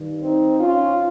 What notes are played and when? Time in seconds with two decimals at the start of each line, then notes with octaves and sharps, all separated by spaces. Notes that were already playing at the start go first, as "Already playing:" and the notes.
Already playing: G2 D#3
0.22 C4 D#4
0.60 C#4 F4